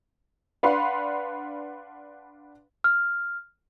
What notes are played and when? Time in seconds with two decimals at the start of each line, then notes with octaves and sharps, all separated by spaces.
0.63 D4 B4 F5 F#5 B5 C6
2.84 F6